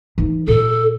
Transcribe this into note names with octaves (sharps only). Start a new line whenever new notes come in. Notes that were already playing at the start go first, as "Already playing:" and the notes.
E3 D#4
A#2 A4